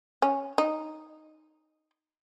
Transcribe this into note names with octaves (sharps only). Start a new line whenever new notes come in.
C#4
D#4